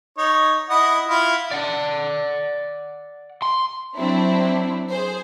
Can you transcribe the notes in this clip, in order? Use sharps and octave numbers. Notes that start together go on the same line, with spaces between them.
D#4 C#5
E4 D#5 F#5
E4 F4
D5 F#5
C6
F#3 C4 D4 E4
G#4 C5